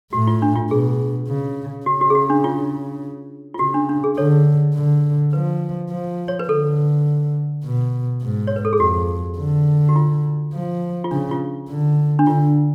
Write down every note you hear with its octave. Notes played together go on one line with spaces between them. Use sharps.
A2 F#4
F4
D4
F4
B2 G#4
C#3
C#3 F#4
F#4
G#4
F#4
D4
F4
F4
C#3 F#4
D4
D4
G#4
D3 A4 C#5
D3
F3 B4
F3
C#5
B4
D3 A4
B2
G#2
C#5
B4
A4
G#4
F2 F#4
D3
F#4
F4
F3
F4
C#3 D4
F4
D3
D4
D3 F4